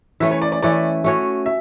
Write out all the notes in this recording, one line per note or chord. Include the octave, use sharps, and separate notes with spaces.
E3 A3 C#4 E5
C#5
D5
D5
E3 A3 C#4 D5
A3 C#4 F#4 C#5
E5